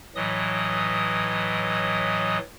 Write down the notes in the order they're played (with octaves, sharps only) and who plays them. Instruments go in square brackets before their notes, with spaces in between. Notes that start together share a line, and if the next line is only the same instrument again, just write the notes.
[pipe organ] A2 E3 F#3 D#5 D#6